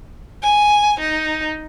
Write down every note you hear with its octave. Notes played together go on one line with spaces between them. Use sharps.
G#5
D#4